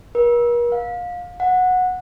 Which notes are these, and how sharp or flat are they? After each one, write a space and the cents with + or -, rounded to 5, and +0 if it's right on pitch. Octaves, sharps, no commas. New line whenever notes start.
A#4 +45
F5 +25
F#5 -15